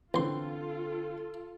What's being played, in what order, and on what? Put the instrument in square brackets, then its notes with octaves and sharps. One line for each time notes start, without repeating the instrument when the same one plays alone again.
[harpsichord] A1 C6 [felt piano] D3 C4 [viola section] F4 A4